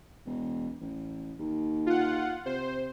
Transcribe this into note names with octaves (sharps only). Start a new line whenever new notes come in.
E1
A1
D#2
F4 F#5
C3 C5